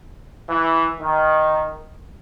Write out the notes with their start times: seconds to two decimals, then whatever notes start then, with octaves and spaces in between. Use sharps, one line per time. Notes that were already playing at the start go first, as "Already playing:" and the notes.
0.49 E3
1.00 D#3